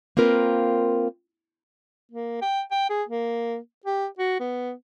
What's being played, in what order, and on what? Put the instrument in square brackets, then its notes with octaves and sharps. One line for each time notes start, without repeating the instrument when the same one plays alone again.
[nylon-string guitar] A#3 C4 F4 A#4 B4
[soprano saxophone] A#3
G5
G5
G#4
A#3
G4
F#4
B3